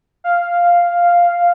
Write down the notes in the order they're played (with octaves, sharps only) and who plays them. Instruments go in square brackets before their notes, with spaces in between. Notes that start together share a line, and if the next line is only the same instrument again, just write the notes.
[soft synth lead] F5